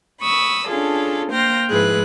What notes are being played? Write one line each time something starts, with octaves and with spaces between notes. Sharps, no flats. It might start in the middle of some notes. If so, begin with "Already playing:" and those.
B5 C#6 D#6 E6
C#4 D4 F4 G#4 A4
A#3 C5 G5 F6 A#6
G#2 F3 E4 G#4 B4 F#6